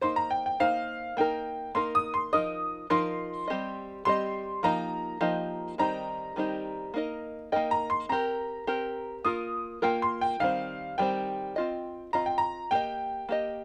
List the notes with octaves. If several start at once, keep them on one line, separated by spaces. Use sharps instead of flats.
A#3 D#4 C5 C6
A#5
G5
G5
A#3 D#4 C5 F5
A#3 D#4 A#4 G5
A#3 D#4 A#4 C6
D#6
C6
F3 D#4 A#4 D#5 D#6
F3 D#4 A#4 D#5 C6
G3 C4 G4 D#5
G3 C4 G4 D#5 C6
F3 A#3 D#4 G4 D#5 A#5
F3 A#3 D#4 G4 D#5
D#3 G3 C4 D#4 G4 A#5
D#3 G3 C4 D#4 G4
A#3 D#4 A#4 D#5
A#3 D#4 A#4 D#5 G5
A#5
C6
C4 G4 A#4 A#5
C4 G4 A#4
A#3 F4 A#4 D#6
A#3 F4 A#4 G5
C6
G5
D#3 G3 C4 F5
D#3 G3 C4 G5
C4 F4 D#5
C4 F4 D#5 A#5
G5
A#5
A#3 G4 D#5 G5
A#3 G4 D#5